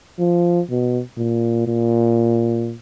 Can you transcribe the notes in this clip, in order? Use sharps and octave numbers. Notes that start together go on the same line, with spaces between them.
F3
B2
A#2
A#2